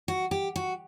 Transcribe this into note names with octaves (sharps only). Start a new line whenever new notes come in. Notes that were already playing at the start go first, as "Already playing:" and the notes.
F#4
G4
F#4